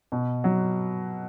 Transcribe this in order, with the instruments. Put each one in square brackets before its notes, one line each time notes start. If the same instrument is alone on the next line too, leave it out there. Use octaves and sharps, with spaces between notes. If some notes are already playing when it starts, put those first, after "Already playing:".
[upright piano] B2
F#3